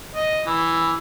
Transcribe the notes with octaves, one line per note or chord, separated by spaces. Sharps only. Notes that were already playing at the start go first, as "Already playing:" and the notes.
D#5
E3